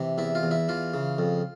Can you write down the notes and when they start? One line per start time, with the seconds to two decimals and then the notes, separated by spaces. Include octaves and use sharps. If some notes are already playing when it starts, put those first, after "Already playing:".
Already playing: C3 E3
0.18 E2 E4
0.35 F4
0.43 E2
0.51 E4
0.69 E3 F4
0.94 C#3
1.18 F2